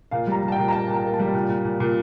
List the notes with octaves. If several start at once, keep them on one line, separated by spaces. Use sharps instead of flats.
A#2 F5
G3 A#5
G3
A5
G5
A#2
A#5
A#3 A5
A#2
A#5
A#3
A5
G3
A#2
A#2
A#2
A#2